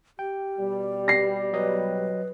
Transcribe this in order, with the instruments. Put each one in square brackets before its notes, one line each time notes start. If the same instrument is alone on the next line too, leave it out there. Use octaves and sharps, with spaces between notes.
[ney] G4 [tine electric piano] G5
[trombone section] B2 G3
[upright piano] A#6 C7
[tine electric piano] F#3 D#5 [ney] B4